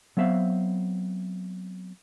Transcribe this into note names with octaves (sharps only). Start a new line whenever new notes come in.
F#3 B3 C4 E5 F5